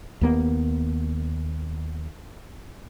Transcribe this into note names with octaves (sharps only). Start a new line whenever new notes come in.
D#2 A#3 B3